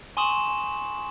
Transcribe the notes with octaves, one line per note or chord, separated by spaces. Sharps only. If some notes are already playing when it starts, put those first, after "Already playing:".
G#5 C6 C#6 D#6 E7 F#7